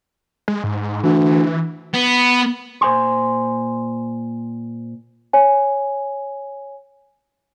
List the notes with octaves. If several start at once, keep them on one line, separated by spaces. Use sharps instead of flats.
G#3
G#2
D2 E3
B3
A#2 C5 G#5 C6
C#5 G#5